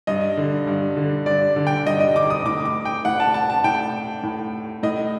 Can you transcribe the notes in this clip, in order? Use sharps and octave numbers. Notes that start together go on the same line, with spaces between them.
G2 D#5
D3
G2
D3
G2 D5
D3
G5
G2 D#5
D#5
D3 D6
D#6
A2 D6
D6
G5
A2 F#5
A5
A5
A5
A2 G5
A2
A2 D#5